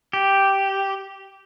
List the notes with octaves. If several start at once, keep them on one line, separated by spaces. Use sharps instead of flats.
G4